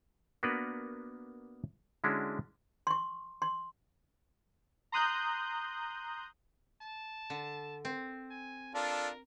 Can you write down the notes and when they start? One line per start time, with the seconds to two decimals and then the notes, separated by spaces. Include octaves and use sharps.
0.43 A#3 B3 D4 F#4 A#4 B4
2.04 D3 G#3 C#4 D4 E4 F#4
2.87 C6 C#6
3.42 C6
4.92 A#5 C6 D#6 F#6 G6
6.82 A5
7.30 D3
7.85 C4
8.31 G#5
8.74 D4 F4 A4 A#4